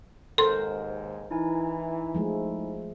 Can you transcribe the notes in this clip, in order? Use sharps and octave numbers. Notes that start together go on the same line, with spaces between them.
D#2 G#2 A4 A#4 C5 C6
E3 D#4 E4 G#5
F3 G#3 A3